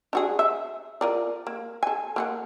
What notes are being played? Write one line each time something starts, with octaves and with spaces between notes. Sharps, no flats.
D4 F#4 G#4
E5
F4 A#4 D5
A#3
A4 G#5
A#3 C4 F#5